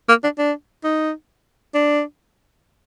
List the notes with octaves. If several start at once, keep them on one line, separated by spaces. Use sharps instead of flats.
A#3
D4
D4
D#4
D4